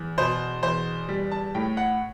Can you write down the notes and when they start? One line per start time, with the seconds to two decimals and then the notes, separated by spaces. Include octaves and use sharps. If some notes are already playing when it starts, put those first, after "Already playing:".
Already playing: E2
0.18 B2 C5
0.63 E2 C5
1.09 G3
1.31 A5
1.55 A2 G5
1.77 F#5